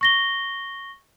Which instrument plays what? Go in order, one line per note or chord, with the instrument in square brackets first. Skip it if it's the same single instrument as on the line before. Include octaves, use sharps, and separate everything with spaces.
[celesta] C#6 A#6 G7